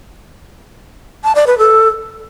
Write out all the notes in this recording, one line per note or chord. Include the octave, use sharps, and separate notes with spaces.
A5
D5
B4
A4